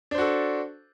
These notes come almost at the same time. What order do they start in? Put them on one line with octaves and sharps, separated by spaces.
D4 C5 F#4 A4